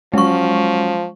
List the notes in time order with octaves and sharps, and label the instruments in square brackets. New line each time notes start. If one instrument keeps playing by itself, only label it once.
[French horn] F3 [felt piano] F#3 C#4 [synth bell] G#3 C#6